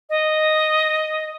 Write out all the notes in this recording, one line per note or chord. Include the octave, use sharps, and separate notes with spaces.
D#5